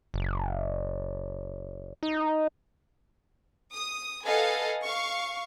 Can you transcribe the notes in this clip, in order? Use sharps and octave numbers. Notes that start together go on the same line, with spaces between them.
F#1
D#4
D#6
A4 B4 D#5 F5 F#5 G#5
F5 C#6